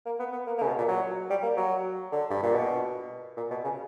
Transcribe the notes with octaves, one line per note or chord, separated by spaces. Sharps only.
A#3
B3
B3
A#3
A#3
C#3
B2
A#2
F#3
G3
A#3
F#3
D3
G2
A#2
B2
A#2
B2
C#3